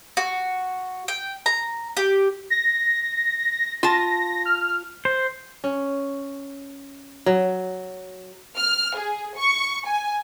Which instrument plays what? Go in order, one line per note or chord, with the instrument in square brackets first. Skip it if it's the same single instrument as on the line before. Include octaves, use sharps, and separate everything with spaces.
[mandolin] F#4
G5
A#5
G4
[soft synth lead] A#6
[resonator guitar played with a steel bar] F4 A5 [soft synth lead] A#6
[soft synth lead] F6
[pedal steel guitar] C5
[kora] C#4
F#3
[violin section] F6
G#4
C#6
G#5